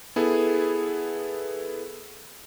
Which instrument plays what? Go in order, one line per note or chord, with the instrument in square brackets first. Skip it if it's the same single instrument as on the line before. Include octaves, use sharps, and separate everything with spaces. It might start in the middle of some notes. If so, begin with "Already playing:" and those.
[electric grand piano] B3 E4 G#4 A4